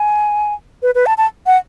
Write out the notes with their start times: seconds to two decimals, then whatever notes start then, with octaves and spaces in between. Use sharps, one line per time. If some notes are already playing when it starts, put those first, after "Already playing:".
Already playing: G#5
0.83 B4
0.95 B4
1.06 A5
1.18 A5
1.46 F#5